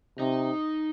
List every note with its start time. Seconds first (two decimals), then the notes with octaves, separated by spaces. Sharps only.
0.19 C3 D#4